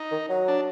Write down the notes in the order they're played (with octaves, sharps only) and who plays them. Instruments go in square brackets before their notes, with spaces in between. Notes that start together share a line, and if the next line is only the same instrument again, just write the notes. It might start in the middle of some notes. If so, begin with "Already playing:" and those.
Already playing: [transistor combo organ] D#4
[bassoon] D#3
F#3
[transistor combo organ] D4